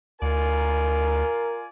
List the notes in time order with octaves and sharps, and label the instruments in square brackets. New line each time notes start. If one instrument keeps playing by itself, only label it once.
[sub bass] D2 [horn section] F4 D5 G#5 [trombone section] A#4